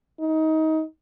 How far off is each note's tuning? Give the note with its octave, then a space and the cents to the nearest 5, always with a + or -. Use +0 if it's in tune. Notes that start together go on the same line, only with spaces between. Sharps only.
D#4 +25